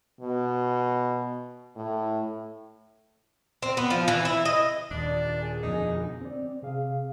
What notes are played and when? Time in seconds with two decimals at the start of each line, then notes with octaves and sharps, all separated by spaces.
0.21 B2
1.76 A2
3.62 C4
3.77 B3
3.90 F3
4.08 E3
4.25 E4
4.45 D#5
4.91 D#1 D4 D5
5.40 G#4 G#5
5.63 F2 B2 D3 D#4
6.22 C4 D5
6.62 C3 G#4 F5